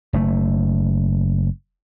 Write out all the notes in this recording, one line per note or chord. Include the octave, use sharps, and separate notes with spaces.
F#1 A3